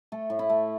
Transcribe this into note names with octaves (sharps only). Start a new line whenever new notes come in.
A3 A4
A2
E4
A3